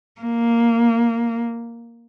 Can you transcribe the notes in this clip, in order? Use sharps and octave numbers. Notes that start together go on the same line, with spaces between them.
A#3